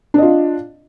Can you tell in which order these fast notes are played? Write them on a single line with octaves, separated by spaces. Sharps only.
D4 D#5 F4